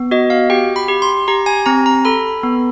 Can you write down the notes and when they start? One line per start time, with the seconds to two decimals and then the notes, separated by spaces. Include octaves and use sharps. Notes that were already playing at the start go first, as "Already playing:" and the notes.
Already playing: B3
0.11 F#4 D#5
0.30 F5
0.50 G4 G5
0.76 B5
0.88 G4
1.02 C6
1.28 G4 A#5
1.46 G#5
1.66 C4 A#5
1.86 A#5
2.05 A4 B5
2.43 B3